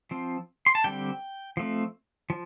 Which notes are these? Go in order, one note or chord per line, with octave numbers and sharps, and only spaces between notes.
F3 C4
C6
A5
D3 G3 C4 G5
F3 A3 C4
F3